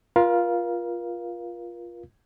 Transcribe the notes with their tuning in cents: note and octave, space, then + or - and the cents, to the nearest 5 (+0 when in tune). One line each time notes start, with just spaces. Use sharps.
F4 +0 A#4 +40 F5 +0